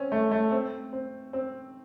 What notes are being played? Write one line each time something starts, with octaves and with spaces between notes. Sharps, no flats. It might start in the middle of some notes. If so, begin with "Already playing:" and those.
Already playing: C4 C#4
A3
A3
C4
C4
C4